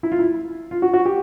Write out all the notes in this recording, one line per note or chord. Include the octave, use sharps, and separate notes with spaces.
E4
F4
E4
F4
F#4
F#4
G4